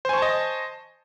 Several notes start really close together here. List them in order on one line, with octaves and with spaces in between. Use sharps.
C5 G#5 C#6 A5 D#5